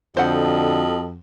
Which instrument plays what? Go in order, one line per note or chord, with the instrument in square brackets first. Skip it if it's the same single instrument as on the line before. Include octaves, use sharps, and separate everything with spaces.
[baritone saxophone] F2 [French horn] D3 [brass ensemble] F#4 A4 D#5 [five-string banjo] C5 F#5